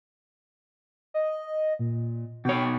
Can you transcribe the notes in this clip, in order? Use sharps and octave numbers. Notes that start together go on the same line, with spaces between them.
D#5
A#2
B2 C#5 G5